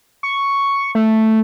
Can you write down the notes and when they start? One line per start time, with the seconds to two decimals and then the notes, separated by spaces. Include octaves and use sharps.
0.23 C#6
0.95 A3